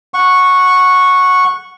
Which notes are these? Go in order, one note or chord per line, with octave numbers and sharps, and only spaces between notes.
F#5 C#6